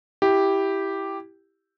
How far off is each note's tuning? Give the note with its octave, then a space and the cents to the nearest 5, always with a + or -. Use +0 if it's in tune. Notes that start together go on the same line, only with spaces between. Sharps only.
E4 +0 G4 +0